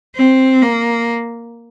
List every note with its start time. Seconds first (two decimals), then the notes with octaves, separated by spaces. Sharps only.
0.16 C4
0.62 A#3